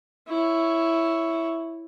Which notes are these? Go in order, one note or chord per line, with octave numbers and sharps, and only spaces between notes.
E4 C#5